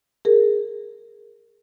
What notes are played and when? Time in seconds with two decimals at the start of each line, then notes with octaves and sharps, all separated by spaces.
0.25 G#4 A#4